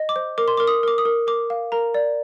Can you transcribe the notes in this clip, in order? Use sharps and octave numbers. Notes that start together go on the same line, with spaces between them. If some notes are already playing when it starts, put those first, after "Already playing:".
Already playing: D#5
D6
C5
A#4 D6
C6
D6
A#4
D#6
A#4 D6
D#6
A#4
A#4 D6
F5
A#4 A#5
D5